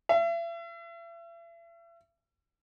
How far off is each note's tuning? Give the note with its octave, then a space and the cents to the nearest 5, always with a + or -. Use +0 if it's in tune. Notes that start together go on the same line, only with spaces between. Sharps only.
E5 +40